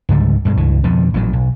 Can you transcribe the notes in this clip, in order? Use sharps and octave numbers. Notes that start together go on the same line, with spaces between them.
C#2 G#2 D3 G3
G2 B2 F#3 G#3
C#2 G2 E3
F2 B2 D3
A1 A#2 F#3
B1